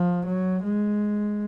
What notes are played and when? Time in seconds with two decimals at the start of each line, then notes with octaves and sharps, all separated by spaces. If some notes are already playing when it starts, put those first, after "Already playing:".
Already playing: F3
0.25 F#3
0.63 G#3